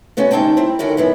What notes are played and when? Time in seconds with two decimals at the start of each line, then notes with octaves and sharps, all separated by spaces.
0.17 C3 B3 C#4 F#4
0.31 D2 G3 C4 D#4 G5 A5
0.57 C4 E4
0.79 D3 D#3 C#4 E4 F#4 A#4
0.97 F#2 E3 B3